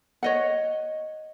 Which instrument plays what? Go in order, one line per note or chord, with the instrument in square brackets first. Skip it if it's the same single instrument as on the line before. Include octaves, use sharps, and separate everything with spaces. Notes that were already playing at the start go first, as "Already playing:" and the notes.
[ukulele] C#5 D#5 F#5